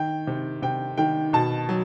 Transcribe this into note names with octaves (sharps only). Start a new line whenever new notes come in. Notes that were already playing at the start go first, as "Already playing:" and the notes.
Already playing: D#3 G5
C3
C3 G5
D#3 G5
B2 A5
F#3